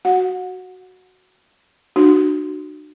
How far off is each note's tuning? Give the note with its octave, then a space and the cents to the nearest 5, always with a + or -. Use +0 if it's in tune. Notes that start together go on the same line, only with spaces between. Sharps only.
F#4 +0 F#5 -25
D4 +45 F#4 +5